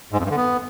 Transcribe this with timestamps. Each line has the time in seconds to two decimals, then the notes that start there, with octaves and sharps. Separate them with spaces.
0.12 G#2
0.18 F2
0.24 G2
0.30 D3
0.37 B3